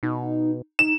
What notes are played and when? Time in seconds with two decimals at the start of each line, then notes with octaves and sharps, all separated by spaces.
0.03 B2 D#4
0.79 D#4 E7